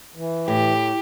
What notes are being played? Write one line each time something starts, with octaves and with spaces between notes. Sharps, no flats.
E3
A2 G4